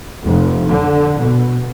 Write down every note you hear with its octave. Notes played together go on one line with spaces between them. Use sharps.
F1
D3
B2